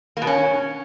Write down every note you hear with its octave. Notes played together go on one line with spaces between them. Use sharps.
A#3
B2
C#4